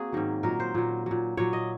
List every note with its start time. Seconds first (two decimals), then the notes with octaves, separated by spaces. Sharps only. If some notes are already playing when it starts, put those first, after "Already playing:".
Already playing: A#3 C4 F#4 G#4
0.13 G#2 D#3 F#3
0.43 A#2 F#3 A#4
0.60 C5
0.74 A#2 F#3
1.06 A#2 F#3
1.37 A#2 F#3 C#5
1.53 D#5